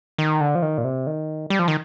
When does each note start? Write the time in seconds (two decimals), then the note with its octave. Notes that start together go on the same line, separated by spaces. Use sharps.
0.18 D#3
0.41 D3
0.55 F3
0.62 D#3
0.78 A#2
0.84 C3
1.07 D#3
1.50 G3
1.59 F3
1.68 D#3